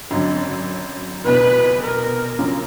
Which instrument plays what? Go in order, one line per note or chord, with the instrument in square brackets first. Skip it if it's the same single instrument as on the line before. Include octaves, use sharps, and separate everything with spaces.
[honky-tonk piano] G#1 F#2 D3 F#3
[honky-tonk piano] F1 E2 B2 [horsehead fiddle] B4
[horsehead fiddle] A#4
[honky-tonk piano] F#2 C#3 F3 A#3 C#4